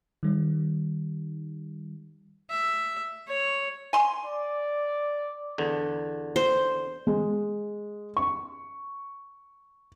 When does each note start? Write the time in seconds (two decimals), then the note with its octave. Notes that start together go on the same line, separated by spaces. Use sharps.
0.23 D#3 G3
2.50 E5
3.28 C#5
3.93 G#5 C6
4.25 D5
5.58 E2 D3
6.36 C5
7.07 G#3
8.17 C#6